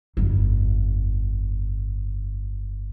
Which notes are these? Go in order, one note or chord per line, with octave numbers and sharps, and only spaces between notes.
G1 F2